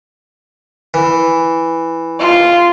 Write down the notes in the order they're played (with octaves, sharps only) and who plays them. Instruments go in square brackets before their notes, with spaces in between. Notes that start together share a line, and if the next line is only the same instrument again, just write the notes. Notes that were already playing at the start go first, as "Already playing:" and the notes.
[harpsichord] E3
[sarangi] F4